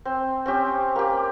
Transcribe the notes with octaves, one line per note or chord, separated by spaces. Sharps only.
C4
C4 C#4 G4
A#3 G4